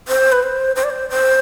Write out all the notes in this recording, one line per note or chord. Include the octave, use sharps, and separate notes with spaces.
C5
B4
C5
C5
D5
C5
C5